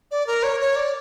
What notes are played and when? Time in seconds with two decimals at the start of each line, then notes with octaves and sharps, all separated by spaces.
0.11 D5
0.27 A#4
0.43 C#5
0.60 C#5
0.76 D5